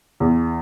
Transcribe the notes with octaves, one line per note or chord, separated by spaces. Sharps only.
E2